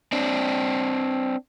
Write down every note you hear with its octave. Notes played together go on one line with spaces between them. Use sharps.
C4 D4